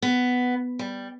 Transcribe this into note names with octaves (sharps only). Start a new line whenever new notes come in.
B3
G3